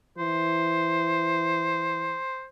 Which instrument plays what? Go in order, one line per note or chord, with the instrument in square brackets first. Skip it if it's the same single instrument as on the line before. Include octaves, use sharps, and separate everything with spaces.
[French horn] E3 [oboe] C5